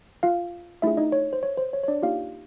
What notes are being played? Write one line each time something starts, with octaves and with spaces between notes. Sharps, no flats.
F4 F5
A3 D4 E4 F4 G#4 E5
D#4 D#5
C#5
C5
C#5
C5
C#5
C#5
D4 D5
A#3 D#4 F4 G4 F5